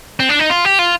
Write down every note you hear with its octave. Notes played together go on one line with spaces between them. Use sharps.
C4
D4
D#4
F4
G4
F4